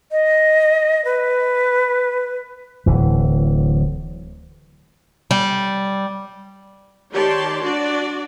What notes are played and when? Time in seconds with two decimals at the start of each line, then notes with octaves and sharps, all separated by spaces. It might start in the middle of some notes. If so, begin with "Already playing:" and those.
0.11 D#5
1.05 B4
2.86 D1 E3
5.31 G3
7.13 D#3 G4 C#5 D5 A5 C6
7.64 D4 F#4 D5